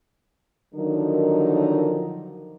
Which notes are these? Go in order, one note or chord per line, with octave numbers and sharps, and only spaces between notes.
D3 D#3 F3 F#3 D#4 A#4